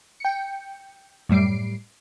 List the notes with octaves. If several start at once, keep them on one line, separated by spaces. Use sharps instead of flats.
G5 C#7
F#2 A2 G3 C7 D7